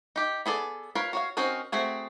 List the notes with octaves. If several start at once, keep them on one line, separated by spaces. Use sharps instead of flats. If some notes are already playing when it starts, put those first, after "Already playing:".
D#4 G4
B3 G#4 A4 D5
F4 A#4 B4 C#5
F#4 C#5 F5
C4 C#4 D#4 F#4 A#4
A3 C4 F#4 G#4